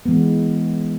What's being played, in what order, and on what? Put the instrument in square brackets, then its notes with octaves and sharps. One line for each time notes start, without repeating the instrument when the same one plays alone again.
[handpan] E3 G#3 B3